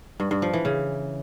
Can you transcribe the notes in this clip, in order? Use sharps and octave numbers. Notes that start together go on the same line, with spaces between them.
G2
G2
F3
E3
C#3